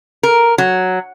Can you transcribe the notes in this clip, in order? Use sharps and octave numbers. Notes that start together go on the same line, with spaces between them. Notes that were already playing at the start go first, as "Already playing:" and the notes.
A#4
F#3